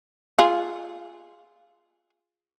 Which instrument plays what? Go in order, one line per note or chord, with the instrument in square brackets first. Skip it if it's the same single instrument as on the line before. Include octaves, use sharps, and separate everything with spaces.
[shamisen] F4 G#4